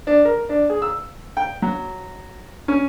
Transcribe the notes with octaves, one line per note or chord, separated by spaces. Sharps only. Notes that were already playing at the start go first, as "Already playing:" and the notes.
D4
A#4
D4
G#4
E6
G5
F#3
C#4